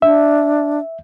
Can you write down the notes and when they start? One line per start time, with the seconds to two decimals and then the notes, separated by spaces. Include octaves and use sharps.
0.02 D4 E5